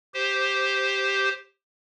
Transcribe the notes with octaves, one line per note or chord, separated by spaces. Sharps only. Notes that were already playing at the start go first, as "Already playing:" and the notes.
G4 C5